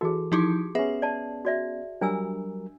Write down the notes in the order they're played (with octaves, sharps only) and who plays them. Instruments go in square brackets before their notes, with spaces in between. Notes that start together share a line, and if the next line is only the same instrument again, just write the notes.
[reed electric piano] E3 A4 [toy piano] F#4 G#4
[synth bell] F3 D#4 E4 [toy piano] G4 C6 D6
[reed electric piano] B3 C#4 [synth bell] G#4 [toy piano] E5
[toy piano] D5 A5
F#4 D5 E5
[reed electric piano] F#3 G3 A#4 [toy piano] D4 G#5 E6